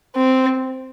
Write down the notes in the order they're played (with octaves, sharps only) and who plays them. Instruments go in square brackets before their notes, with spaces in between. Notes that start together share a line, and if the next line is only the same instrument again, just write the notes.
[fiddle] C4